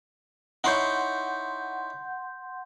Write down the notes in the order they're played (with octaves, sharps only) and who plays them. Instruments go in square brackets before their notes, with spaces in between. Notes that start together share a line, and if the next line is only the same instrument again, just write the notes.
[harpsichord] D#4 E4 C#5 [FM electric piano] F#5 C6 G6